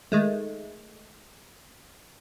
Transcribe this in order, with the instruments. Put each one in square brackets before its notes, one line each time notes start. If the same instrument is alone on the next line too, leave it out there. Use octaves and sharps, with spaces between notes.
[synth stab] D#3 G#3 A3